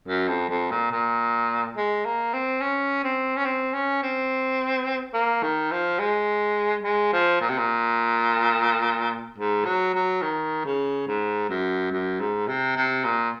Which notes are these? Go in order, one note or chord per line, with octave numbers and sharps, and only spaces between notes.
F#2
F2
F2
A#2
A#2
G#3
A#3
C4
C#4
C4
C#4
C4
C#4
C4
A#3
D#3
F3
G#3
G#3
F3
A#2
C3
A#2
G#2
F#3
F#3
D#3
C#3
G#2
F#2
F#2
G#2
C3
C3
A#2